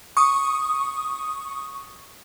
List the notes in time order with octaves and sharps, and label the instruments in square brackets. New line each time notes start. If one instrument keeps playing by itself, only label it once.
[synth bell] C#6 D#6